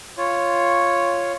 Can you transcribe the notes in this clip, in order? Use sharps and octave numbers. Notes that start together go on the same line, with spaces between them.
F4 C#5